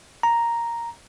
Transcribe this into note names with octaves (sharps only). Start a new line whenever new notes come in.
A#5